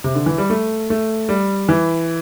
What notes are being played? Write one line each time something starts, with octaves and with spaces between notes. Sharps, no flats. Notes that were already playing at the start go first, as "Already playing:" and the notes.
C3
D3
E3
G3
A3
A3
G3
E3